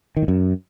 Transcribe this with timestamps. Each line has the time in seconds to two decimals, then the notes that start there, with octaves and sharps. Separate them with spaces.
0.17 D#3
0.22 A2
0.28 F#2